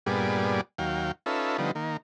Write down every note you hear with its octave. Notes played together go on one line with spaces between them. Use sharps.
G2 A#2 G3 B3 G#4 D5
D#2 F#3 F5 G5
C#4 D#4 F4 A4 B4 E5
D3 F3 G3 B3 D#4
D#3 A#3